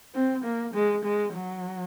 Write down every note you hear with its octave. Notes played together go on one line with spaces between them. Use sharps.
C4
A#3
G#3
G#3
F#3